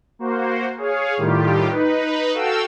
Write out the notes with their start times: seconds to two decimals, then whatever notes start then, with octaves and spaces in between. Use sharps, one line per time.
0.19 A#3 F#4 C5
0.77 G#4 C#5 F5
1.17 A2 D#3 G3 F4 G4
1.69 D#4 B4
2.34 F#4 A4 F5 G5 E6